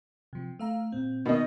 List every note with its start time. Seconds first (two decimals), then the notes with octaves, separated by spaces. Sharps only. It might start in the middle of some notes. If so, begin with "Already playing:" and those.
0.33 C3 F3
0.59 A3 F5 A#5
0.92 A#2 C4
1.25 B2 D#3 D#5